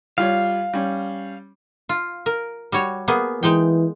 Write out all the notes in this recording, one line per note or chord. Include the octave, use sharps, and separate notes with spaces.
G3 F4 C#5 F5
G3 C#4
F4
A#4
G3 F#4 C#5
A#3 B3 G#4
E3 G#3 D#4 G5